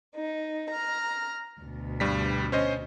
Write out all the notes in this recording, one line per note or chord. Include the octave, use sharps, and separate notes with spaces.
D#4
A#5 F6
D2 B2
G2 G3 B6
C#4 C5 D#5